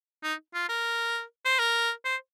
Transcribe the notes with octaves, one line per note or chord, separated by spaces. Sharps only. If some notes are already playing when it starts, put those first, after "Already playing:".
D#4
F4
A#4
C5
A#4
C5